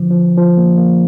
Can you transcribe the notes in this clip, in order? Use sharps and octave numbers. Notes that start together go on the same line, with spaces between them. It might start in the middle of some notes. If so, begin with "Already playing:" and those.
Already playing: D3 F3
F3
F3
A#3
A#3